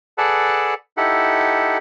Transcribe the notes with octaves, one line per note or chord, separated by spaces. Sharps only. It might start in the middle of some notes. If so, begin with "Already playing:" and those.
G#4 A4 B4 D5 F#5 A5
D#4 E4 G4 A4 F#5